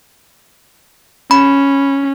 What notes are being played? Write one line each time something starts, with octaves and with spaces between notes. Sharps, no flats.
C#4 B5